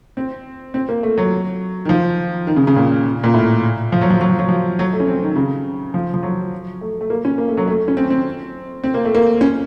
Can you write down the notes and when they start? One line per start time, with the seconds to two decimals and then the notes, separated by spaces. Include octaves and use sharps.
0.17 C4
0.74 C4
0.89 A#3
1.03 A3
1.18 F#3
1.85 D#3
1.89 F3
2.47 D#3
2.56 C#3
2.67 C#3
2.76 A#2
3.24 A#2
3.34 A2
3.92 F3
4.01 F#3
4.10 F3
4.21 F#3
4.29 F3
4.39 F#3
4.49 F3
4.79 F#3
4.93 A3
5.00 C#4
5.08 C4
5.22 D#3
5.36 C#3
5.94 F3
6.14 F3
6.23 F#3
6.81 A3
7.01 A3
7.10 A#3
7.25 C#4
7.38 A#3
7.48 A3
7.57 F#3
7.67 A3
7.88 C#4
7.97 C4
8.10 C4
8.84 C4
8.94 A#3
9.05 A3
9.15 A#3
9.41 C#4